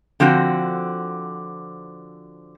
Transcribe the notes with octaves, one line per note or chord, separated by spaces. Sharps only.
D3 F3 C4 F#4